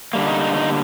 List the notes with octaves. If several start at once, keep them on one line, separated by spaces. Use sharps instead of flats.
D3 G3 A#3
D#4
D#4
D#4